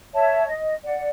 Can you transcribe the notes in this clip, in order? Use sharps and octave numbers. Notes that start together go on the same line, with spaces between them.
C#5 E5 A5
D#5
D5 F#5